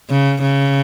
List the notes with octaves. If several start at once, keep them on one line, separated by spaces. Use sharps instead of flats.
C#3
C#3